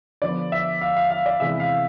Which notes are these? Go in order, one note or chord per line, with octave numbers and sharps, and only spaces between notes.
D3 F3 B3 D5
E5
F5
F5
F5
D5
C3 E3 G#3 B3 E5
F5